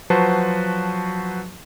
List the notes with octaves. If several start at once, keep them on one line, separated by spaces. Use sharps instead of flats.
F3 F#3 F#4 B4 C5 A5